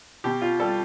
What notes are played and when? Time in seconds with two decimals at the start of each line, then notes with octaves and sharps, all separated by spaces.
0.24 B2 G4
0.42 F4
0.60 G3 A4